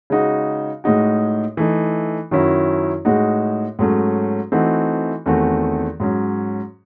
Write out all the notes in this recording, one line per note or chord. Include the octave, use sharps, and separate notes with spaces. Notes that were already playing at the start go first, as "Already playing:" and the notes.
C#3 G#3 D#4 F#4
A2 G#3 D#4 F#4
E3 A3 D#4
F#2 D#3 F#3 C#4 E4
A2 G#3 D#4 F#4
G#2 F#3 A3 C#4
E3 A3 C4 D#4 F#4
E2 D#3 A3 C4 F#4
G#2 F#3 C#4